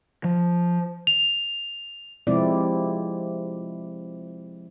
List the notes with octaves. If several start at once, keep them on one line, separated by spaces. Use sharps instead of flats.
F3
F7
C3 F3 G#3 C4 E4 D5